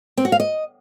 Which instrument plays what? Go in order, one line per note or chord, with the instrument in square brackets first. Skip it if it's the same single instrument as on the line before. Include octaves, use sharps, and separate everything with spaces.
[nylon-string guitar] C4
F#4
F5
D#5